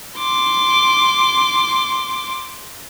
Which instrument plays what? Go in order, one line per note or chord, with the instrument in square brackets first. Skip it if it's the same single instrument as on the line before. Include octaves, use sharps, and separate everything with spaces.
[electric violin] C6 D6